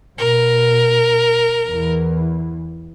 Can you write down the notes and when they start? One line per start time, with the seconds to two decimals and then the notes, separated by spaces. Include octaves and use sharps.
0.19 B2 A#4
1.68 E2 E3